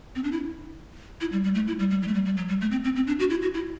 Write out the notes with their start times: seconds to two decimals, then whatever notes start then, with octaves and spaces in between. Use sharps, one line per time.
0.15 C4
0.24 D4
0.32 E4
1.21 E4
1.32 G3
1.44 G3
1.55 A3
1.67 E4
1.79 G3
1.91 G3
2.02 F#3
2.08 A3
2.14 G3
2.25 G3
2.37 F#3
2.48 G3
2.61 A3
2.71 C4
2.84 C4
2.96 C4
3.07 D4
3.19 F#4
3.30 E4
3.42 F#4
3.54 E4